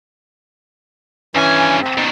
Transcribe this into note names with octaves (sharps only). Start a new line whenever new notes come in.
G2 E3 C#4 G#5
C4
B2 D#3